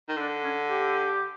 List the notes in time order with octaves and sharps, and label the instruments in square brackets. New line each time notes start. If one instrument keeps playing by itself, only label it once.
[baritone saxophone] D#3
[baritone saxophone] D3 [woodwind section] D4
[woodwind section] C#4
G4